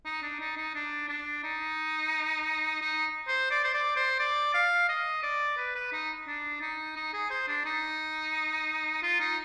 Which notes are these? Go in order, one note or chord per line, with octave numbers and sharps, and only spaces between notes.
D#4
D4
D#4
D#4
D4
D4
D#4
D#4
C5
D5
C5
D5
C5
D5
F5
D#5
D5
B4
B4
D#4
D4
D#4
D#4
G#4
C5
D4
D#4
F4
D#4